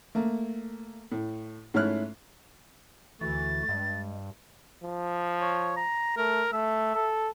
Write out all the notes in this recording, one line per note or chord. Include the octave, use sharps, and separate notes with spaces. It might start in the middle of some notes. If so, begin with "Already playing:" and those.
A3 A#3
A2
G#2 A3 C#4 E4 F6 F#6
D2 D3 E3 F#4 A6
G2 G#3
F3
C#5
A#5
A3 A#4
A3 E5
A4